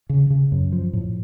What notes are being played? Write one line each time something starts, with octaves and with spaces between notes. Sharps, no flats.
C#3
C#3
F#2
F3
A2